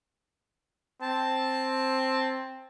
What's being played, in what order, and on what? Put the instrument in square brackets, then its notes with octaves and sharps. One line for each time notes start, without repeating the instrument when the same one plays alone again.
[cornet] C4 [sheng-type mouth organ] A5